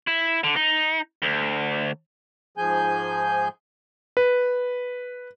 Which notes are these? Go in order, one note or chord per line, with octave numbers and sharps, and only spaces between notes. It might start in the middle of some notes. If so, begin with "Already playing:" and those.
E4
D3
D#4
D2
G#2 F3 G#4 G#5 G6
B4